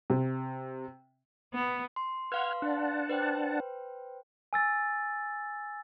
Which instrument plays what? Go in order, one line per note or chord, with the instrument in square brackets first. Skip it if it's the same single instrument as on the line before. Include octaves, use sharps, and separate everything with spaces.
[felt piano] C3
[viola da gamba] B3
[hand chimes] C6
[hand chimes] B4 F5 C6 [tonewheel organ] F#5 F6 G#6
[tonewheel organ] D4 F#5 A5
[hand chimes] B4 C5 G5
[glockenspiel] G#5 E6 A6